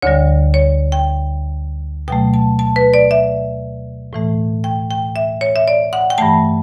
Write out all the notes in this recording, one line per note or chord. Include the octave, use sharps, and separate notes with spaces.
D2 D3 G3 C#5
C#5
G5
B2 F#3 A3 G5
A5
A5
B4
D5
E5
A2 E3 A3
G5
G5
E5
C#5
E5
D5
F#5
G5
G2 E3 A3 A5